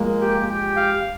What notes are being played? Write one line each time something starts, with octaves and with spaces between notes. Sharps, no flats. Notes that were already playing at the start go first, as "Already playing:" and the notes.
Already playing: F3 G#3 A#3
G4
G4
F5